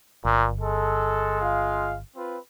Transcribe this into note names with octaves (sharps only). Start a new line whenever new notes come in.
G1 A#2
G#3 A4
F4 F5
C4 F4 B4